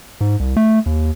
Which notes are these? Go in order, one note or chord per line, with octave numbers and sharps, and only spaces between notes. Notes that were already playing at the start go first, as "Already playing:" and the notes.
G#2
C2
A3
D#2